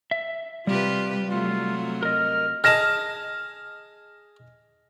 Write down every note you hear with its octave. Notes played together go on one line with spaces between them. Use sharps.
E5
C3 G3 F4 G4 B4
C3 F#3 A3 F4
A#4 D#5 F6
G#4 D#5 A5 F6 A#6 E7